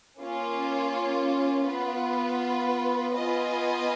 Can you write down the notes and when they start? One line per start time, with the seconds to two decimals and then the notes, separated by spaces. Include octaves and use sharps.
0.21 A#3 C#4 F4
1.67 B3 F4 B4
3.15 B3 F4 B4 D#5 G#5